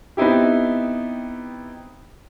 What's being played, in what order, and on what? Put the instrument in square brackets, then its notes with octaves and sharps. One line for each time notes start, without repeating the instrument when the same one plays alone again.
[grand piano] B3 C4 D#4 E4 G4